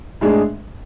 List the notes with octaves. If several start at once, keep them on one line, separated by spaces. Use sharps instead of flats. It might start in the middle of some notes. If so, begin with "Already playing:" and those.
A2 G#3 D4 G#4